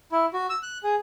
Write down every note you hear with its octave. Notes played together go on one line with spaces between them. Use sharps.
E4
F#4
E6
F#6
G#4